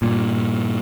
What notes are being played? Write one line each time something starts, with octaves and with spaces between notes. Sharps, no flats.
G2 A#2